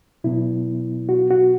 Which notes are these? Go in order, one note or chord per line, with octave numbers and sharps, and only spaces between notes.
B2 F#3 B3 E4
F#4
F#4